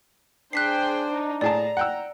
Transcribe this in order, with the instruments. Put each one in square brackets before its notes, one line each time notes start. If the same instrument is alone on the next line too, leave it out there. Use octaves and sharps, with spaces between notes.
[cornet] D4 [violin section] G#4 C5 G5 [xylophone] F#6 B6 C7
[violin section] D#4
[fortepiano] A2 G#4 A5 [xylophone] D5 [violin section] A#5
[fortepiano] F#5 G5 E6